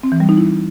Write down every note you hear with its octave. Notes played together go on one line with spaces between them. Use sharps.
C4
E3
G3
D#4
E4